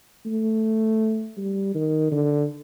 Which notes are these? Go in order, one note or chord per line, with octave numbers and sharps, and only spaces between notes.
A3
G3
D#3
D3